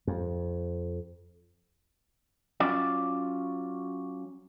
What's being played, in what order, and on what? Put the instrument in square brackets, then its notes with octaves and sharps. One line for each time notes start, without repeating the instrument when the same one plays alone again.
[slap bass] F2
[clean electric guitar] F#3 C#4 F4 D5